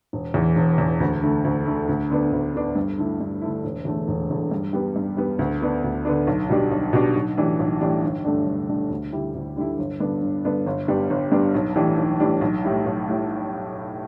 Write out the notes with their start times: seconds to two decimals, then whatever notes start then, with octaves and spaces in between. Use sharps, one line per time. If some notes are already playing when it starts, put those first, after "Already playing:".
0.13 E1
0.34 E2 E3
0.56 E1
0.78 E2 E3
1.00 D2
1.22 D3 A3
1.44 D2
1.66 D3 A3
1.89 D2
2.10 D3 B3 D4
2.32 D2
2.54 D3 B3 D4
2.75 G2
2.98 D3 A3 E4
3.21 G2
3.41 D3 A3 E4
3.64 E1
3.85 E2 D3 A3
4.08 E1
4.30 E2 D3 A3
4.51 G2
4.73 G3 B3
4.96 G2
5.17 G3 B3
5.39 D2
5.61 D3 B3 D4
5.84 D2
6.05 D3 B3 D4
6.27 B1
6.49 B2 G3 D4
6.71 B1
6.93 B2 G3 D4
7.16 B1
7.37 A2 E3 G3 D4
7.59 B1
7.81 A2 E3 G3 D4
8.03 G1
8.24 G2 D3 A3 D4
8.46 G1
8.68 G2 D3 A3 D4
8.90 D2
9.13 D3 G3 E4
9.35 D2
9.57 D3 G3 E4
9.79 G1
10.00 G2 D3 B3 D4
10.22 G1
10.45 G2 D3 B3 D4
10.66 G1
10.88 G2 G3 B3 D4
11.10 G1
11.32 G2 G3 B3 D4
11.54 B1
11.75 A2 E3 G3 D4
11.98 B1
12.20 A2 E3 G3 D4
12.41 B1
12.64 A2 G3 E4
12.86 B1
13.08 A2 G3 E4